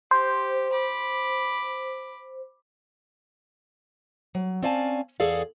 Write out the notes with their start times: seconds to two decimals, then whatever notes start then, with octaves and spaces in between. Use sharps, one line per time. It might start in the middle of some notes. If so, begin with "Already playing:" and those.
0.11 G4 C5
0.72 B5 D6
4.35 F#3
4.63 C4 C#4 D5 F5 G#5 A5
5.20 E2 G#4 A4 D5 F5